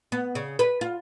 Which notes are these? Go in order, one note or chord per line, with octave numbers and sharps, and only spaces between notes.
B3
C#3
B4
F4